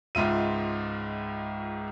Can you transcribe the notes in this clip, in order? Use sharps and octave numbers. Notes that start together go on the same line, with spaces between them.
C#2 G#2 F4 E5 D#7